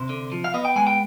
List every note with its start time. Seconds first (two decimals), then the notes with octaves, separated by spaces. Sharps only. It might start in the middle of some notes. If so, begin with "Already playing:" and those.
Already playing: C3 C5
0.09 D3
0.32 F3
0.44 F5
0.54 B3 D#5
0.65 G5
0.76 G#3 G#5
0.87 G5